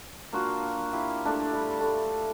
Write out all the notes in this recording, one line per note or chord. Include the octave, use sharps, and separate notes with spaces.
A#3 D4 F4 F#4
E4 F4 G4
A3 D4
G3 G4
A3